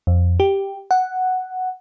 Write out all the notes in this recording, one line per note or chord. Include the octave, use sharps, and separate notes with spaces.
F2
G4
F#5